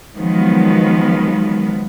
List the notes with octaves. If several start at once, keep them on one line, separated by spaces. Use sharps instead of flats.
D#3 F3 F#3 G#3 B3